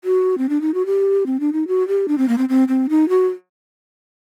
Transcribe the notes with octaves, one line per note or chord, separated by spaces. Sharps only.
F#4
C4
D4
D#4
F#4
G4
C4
D4
D#4
F#4
G4
D4
C4
A#3
C4
C4
C4
D#4
F#4